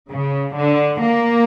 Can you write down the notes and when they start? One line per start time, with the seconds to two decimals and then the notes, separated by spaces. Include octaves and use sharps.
0.11 C#3
0.56 D3
1.01 A#3